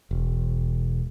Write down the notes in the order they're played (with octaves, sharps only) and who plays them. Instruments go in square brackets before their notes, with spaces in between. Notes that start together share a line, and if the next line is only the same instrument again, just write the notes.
[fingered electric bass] E1